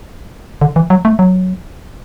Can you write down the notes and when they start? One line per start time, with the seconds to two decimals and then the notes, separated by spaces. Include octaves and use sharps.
0.61 D3
0.76 E3
0.90 F#3
1.05 A3
1.19 F#3